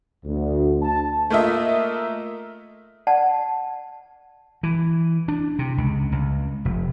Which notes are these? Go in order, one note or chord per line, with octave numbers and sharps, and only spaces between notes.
D2
A5
A3 A#3 F4 D#5 E5
D5 F#5 A5
E3
D4
C3
C#2
C#2
F1